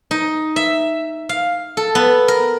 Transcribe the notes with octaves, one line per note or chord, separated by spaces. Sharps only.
D#4
E5
F5
A4
B3
A#4